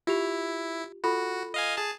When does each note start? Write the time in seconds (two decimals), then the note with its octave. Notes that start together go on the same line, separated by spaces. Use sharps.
0.07 E4 F4 G4 F7
1.04 F4 F#4 A4 B5
1.54 D#5 F5 G#5
1.77 G#4 A5